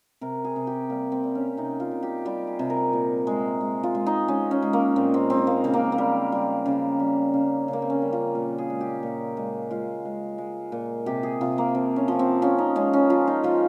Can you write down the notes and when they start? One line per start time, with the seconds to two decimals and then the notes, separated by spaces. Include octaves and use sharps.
0.21 C3 A#4
0.44 G#4
0.56 C3
0.67 G4
0.90 G3 A#3
1.12 C4
1.24 G3
1.35 C#4
1.57 C3 D#4
1.80 F4
1.91 C3
2.03 G4
2.25 G3 G4
2.47 G#4
2.59 C3
2.70 A#4
2.93 A#2
3.27 G#3
3.61 G#3
3.83 F4
3.95 G#3
4.06 D#4
4.28 G#3 C#4
4.51 C#4
4.62 G#3
4.73 A#3
4.96 A#2 C4
5.14 C4
5.30 G#3 C4
5.47 A#3
5.64 C#3 C4
5.74 A#3
5.92 A#3
5.98 G3
6.32 G3
6.66 C#3
7.00 G3
7.34 C#3
7.68 C#3
7.73 A#3
7.82 C4
7.90 C#4
8.02 G3
8.13 F4
8.35 A#2
8.58 G#4
8.70 G#3
8.81 G4
9.03 A#2
9.37 G#3
9.71 G#3 F4
10.05 G#3
10.38 G#3
10.72 A#2
11.06 C3 G4
11.23 G#4
11.41 C3 F4
11.58 A#3
11.74 F3 C4
11.96 C#4
12.08 F3
12.19 C4
12.42 F3 C#4
12.58 D#4
12.76 G#3 C#4
12.93 C#4
13.10 F3 F4
13.27 D#4
13.43 F3 F4